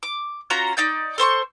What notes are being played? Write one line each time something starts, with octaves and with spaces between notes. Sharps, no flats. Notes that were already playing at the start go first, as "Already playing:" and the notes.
D6
C#4 F4 F#4 A#5
D#4 D5 G6
A4 C5 C6 C#6